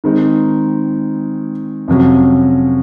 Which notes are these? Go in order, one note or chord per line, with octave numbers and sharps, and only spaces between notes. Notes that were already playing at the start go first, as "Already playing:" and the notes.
D#3 G#3 C4 D#4
F2 C3 F#3 C#4